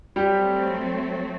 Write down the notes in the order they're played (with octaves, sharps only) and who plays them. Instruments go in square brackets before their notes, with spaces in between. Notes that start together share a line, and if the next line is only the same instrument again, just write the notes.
[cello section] F#3 A3 C4 [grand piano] G3 G4